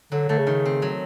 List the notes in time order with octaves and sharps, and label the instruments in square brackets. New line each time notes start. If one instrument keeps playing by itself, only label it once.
[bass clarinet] D3 [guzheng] F#3
[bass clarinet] D3 [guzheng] A3
[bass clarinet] C#3
[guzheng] D#3
C4
F#3